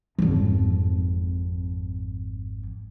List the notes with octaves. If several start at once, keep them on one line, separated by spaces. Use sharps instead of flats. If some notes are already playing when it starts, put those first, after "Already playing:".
G#1 F2